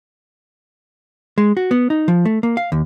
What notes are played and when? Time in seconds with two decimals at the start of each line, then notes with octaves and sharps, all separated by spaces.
1.38 G#3
1.57 F#4
1.71 B3
1.90 D#4
2.08 F3
2.25 A3
2.43 A#3
2.57 F5
2.72 D#2